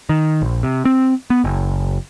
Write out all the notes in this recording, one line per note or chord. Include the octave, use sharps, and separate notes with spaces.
D#3
A#1
C3
C4
B3
F#1